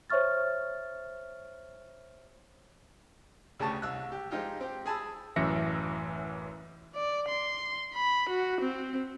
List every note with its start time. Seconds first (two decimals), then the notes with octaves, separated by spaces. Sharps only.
0.10 C5 C#5 E5 C#6 F6 A6
3.59 D2 C#3 G4 A5 C#6
3.82 C2 E6 F#6
4.12 G4
4.31 F3 G#3 D#4 F4 G4
4.60 C4 G4
4.86 G#4 G#5 A5 B5 E6
5.36 A1 F#2 E3 E5 A#6 C#7
6.96 D5
7.29 C6
7.95 B5
8.30 F#4
8.61 C4